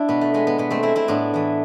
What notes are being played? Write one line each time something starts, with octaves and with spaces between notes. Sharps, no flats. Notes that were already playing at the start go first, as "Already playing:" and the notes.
Already playing: D4 E4
B2 B3
A3
G#3 B3
B3
B2 B3
A3 C4
G#3 C4 E4
C4 E4
A2 B3 D4
E3 A3